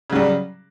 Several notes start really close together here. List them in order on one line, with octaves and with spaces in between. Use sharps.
C#3 F#3 G3